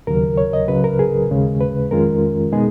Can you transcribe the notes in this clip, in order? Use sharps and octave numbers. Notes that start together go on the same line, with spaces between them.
D#2 C#3 F#3 A#4
C#5
D#5
C#2 C#3 F#3 B4
A#4
G#4
D#2 C#3 G#3
B4
F2 D#3 G#3 C#4 F4 A#4
B2 G#3 B3 D#4 G#4